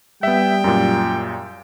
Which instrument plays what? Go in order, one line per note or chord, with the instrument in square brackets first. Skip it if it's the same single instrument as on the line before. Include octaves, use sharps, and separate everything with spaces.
[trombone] G3 [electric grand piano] B3 E5 [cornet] G5
[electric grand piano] F#2 A#2